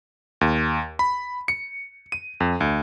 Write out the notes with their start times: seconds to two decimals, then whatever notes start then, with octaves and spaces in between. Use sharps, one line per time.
0.41 D#2
0.99 B5
1.48 C#7
2.12 D#7
2.40 F2
2.60 D2